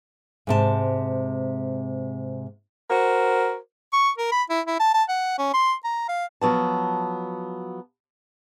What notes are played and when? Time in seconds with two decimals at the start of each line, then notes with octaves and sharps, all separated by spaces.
0.47 G#2 C3 A5
2.90 F#4 A#4 C5
3.93 C#6
4.18 A#4
4.32 B5
4.50 E4
4.66 E4
4.80 A5
4.94 A5
5.09 F#5
5.38 C#4
5.54 C6
5.84 A#5
6.08 F5
6.41 F3 F#3 B3 A5